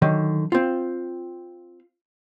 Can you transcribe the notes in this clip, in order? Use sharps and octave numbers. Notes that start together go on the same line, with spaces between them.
D3 D#3 F#3
C4 F4